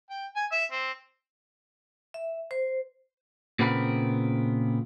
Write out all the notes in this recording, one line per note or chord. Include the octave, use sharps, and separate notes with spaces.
G5
G#5
E5 E6
C4
E5
C5
A#2 C#3 B3 C4 A#4 B5